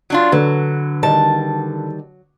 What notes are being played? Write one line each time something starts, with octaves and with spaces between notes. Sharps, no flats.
F#3 D4 F4
D3 F#3 B4
D#3 G3 A5